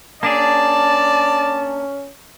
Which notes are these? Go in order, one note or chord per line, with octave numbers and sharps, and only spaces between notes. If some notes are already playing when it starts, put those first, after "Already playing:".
A#3 C#4 D4 G#4 D5 A5